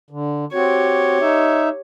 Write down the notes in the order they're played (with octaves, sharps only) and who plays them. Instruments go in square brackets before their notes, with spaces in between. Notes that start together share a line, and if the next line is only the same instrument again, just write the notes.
[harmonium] D3
[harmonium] C4 F#4 [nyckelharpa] G4 C#5
[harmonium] D#4 E5